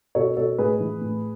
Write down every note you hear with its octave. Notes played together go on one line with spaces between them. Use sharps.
B2 A4 C#5
B2 A4 C#5
A2 G#4 B4
E3
A2